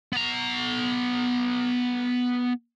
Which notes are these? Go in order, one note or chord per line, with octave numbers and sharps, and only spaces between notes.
B3 A#5